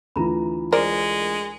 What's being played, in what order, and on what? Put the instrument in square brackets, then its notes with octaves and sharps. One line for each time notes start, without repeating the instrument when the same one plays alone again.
[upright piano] D2 E3 [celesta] F4 A#5 B5
[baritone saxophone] G#3 [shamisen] A#4 C5 D5